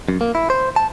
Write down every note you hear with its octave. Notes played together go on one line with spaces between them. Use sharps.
F#2
A#3
E4
C5
A5